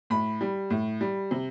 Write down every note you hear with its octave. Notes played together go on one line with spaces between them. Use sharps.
A2 B5
G3
A2
G3
C3